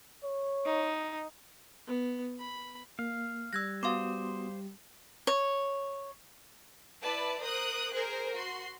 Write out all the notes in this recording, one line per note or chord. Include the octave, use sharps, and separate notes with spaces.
C#5
D#4
B3
B5
A#3 F5
G3 E6 F#6 G#6 A#6
B3 F#4 C5 F5 C6 D6 D#6
C#5
E4 B4 D5 A5
A#4 C5 D#6 F#6
G#4 A#4 C5
F#4 C6